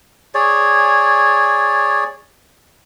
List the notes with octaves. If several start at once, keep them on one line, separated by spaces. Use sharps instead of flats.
G#4 C#5 D5